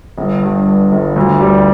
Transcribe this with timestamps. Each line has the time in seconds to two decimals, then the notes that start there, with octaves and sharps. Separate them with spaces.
0.18 G1
0.42 G2
0.67 G2
0.92 G1
1.16 D2
1.41 G3